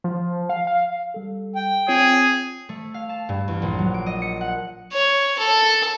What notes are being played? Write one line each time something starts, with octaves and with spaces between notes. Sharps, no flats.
F3
F5
F5
G3 A4
G5
C4 F4 G#4 C#5
A3
F5
A5
G2
E2
A#1
F#3
D7
D#5
C#7
F#5
C#5
A4